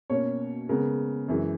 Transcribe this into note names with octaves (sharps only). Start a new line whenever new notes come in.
B2 A#3 C#4 C#5
C#3 G#3 B3 A#4
F#2 E3 G#3